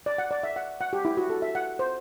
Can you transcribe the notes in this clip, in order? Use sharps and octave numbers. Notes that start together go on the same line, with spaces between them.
D5
F#5
D5
E5
F#5
F#5
G4
E4
F#4
A4
E5
F#5
C5